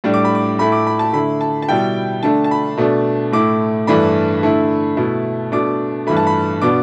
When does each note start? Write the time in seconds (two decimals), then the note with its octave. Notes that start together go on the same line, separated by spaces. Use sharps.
0.04 A2 G3 D4
0.14 D6
0.25 B5
0.35 D6
0.59 A2 A3 E4 B5
0.72 D6
0.87 B5
0.99 A5
1.13 D3 A3 E4 B5
1.41 A5
1.62 A5
1.68 B2 G3 E4 G5
2.23 D3 A3 D4 A5
2.44 A5
2.51 B5
2.77 B2 A3 D4
3.32 A2 A3 E4 D6
3.87 G2 E3 A3 D4 B5
4.43 D3 A3 E4
4.97 B2 A3 E4
5.52 B2 A3 D4 D6
6.07 G2 E3 A3 B5
6.17 A5
6.27 B5
6.62 B2 B3 D4 D6